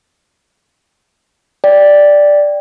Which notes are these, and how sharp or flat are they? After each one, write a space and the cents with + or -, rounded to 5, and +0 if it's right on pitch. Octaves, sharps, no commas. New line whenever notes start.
D5 +0 G5 +0